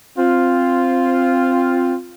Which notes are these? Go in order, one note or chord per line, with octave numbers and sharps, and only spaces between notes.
C4 F4